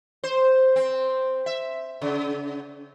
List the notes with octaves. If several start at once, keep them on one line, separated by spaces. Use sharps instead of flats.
C5
C4
E5
C#3